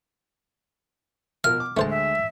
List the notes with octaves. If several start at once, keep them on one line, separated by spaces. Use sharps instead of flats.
B2 F3 A#4 F5 F6
D6
D2 G#3 A3 C5 A5
E5